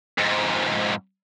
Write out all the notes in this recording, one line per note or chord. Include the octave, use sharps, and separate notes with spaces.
F2 G#2